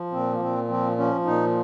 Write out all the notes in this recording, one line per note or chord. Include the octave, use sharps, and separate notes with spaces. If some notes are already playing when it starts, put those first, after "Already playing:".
Already playing: F3
A#2 C4
A#3
A#2 C4
F3 C4
F3 C#4
A#2 D#4